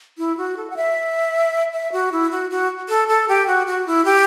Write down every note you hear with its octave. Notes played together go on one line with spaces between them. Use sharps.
E4
F#4
A4
F#5
E5
E5
F#4
E4
F#4
F#4
A4
A4
G4
F#4
F#4
E4
G4